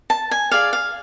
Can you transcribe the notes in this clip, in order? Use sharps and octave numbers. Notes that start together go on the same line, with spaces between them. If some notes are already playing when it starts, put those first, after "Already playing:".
A5
G#5
G#4 D5 F5
F5